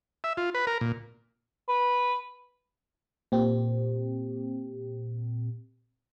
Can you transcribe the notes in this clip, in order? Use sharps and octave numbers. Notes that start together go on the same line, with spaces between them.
E5
F4
B4
A#4
A#2
B4
A#2 C4 G4